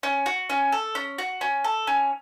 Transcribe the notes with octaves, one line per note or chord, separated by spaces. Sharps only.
C#4
F#4
C#4
A4
C#4
F#4
C#4
A4
C#4